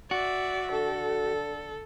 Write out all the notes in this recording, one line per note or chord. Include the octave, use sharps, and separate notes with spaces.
F#4 D5 E5
D3 A4